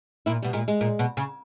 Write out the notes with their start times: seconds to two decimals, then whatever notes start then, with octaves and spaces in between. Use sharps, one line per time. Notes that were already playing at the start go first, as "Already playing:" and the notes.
0.26 A#2 E4
0.43 B2 G3
0.53 A#2 G#3
0.68 G#3
0.81 A#2
0.99 B2
1.17 C#3